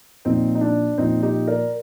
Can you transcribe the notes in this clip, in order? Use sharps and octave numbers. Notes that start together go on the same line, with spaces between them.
A#2 F3 C4 D#4
D#4
D4
A#2 F3 C4 D#4
D#4 G4
A#4 D5